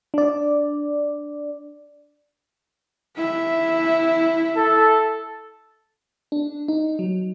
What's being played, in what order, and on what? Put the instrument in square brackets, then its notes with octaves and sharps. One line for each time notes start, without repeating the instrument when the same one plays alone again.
[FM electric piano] D4 D5
[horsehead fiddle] E4 E5
[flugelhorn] A4
[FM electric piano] D4
D#4
F#3